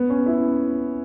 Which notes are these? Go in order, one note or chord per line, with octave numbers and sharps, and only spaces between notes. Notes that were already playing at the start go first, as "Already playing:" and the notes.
Already playing: B3
C#4
E4